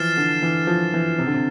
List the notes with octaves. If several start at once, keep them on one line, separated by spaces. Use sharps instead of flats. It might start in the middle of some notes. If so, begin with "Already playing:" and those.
Already playing: E3 F3 F6 A6 C7 E7
D3
E3
F3
E3
C3
D3
C3